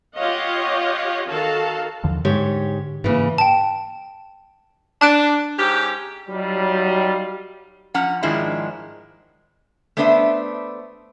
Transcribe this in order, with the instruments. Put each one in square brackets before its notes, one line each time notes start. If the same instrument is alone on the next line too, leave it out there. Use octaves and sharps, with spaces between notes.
[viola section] F4 G4 C#5 D#5 F5 F#5
D#3 F#4 A4 F5 A5
[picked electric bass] D#2 D3 F3
[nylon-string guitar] G#2 G4 C#5 [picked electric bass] D3
[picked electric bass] G#2 A#3 [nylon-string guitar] C#3 E3
[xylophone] G5 A5
[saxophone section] D4 [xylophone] A5 F#6 D7
[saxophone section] G#2 C#4 G4
[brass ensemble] F#3 G3 D#4 F4
[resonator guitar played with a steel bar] F3 C#4 F#5 A#5
G#2 D#3 F3 G#3 D4 E4
A3 B3 D4 B4 C5 E5